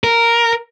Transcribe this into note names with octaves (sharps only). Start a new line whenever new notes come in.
A#4